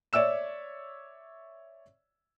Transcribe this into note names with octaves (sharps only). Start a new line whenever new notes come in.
C#5 D5 E5 E6 E7